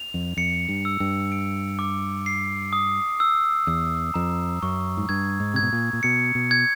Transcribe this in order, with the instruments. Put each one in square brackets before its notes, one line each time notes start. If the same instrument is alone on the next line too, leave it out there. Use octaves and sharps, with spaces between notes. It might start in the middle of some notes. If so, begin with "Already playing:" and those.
Already playing: [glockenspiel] F7
[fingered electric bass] F2
[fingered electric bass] F2 [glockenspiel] C#7
[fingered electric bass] G2
[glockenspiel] E6
[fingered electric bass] G2
[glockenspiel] D7
D6
C7
D#6
E6
[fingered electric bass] E2 [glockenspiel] E6
[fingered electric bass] F2 [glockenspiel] A#5
[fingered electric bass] F#2 [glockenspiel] C#6
[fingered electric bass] G#2
[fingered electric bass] G2 [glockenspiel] G#6
[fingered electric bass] G#2
[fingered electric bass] C3 [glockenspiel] G#6
[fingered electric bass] B2
A#2
A#2
[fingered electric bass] B2 [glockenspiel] C#7
[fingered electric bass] B2
[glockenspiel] G#6